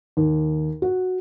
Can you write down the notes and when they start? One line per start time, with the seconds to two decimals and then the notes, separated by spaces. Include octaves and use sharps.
0.17 D#2
0.82 F#4